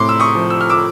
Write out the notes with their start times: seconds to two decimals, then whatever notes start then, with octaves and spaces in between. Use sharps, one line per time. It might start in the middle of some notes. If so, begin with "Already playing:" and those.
Already playing: A2 C3 C6 D6
0.09 E6
0.20 C#6 D#6
0.35 F3
0.50 E6
0.61 F6
0.69 D6 E6